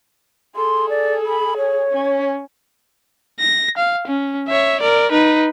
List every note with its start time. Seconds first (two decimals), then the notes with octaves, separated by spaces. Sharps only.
0.56 G#4 A4 C6
0.89 D5
1.25 B5
1.57 C#5
1.91 C#4
3.40 A#6
3.78 F5
4.08 C#4
4.49 C#5 E5
4.81 A#4 D5
5.12 D#4 B4